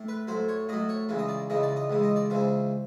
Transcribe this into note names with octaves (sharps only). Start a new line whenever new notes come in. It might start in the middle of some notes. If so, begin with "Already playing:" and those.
Already playing: A2
B4
A2 F#3 C5
C#5
A2 F#3 D#5
C#5
C#2 C#3 E3
D#5
D5
C#2 C#3 E3 D#5
D5
D#5
C#2 C#3 E3
D#5
D5
C#2 C#3 E3 C5